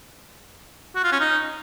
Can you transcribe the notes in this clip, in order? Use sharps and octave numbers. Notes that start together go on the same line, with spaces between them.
F#4
F4
C#4
D#4